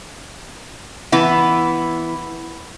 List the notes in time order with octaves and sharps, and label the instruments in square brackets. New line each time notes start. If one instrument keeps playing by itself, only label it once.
[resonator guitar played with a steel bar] E3 B3 E4